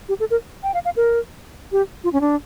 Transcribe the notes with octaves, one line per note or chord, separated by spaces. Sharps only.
G4
A4
A#4
G5
F5
F5
A#4
G4
F4
C#4
D4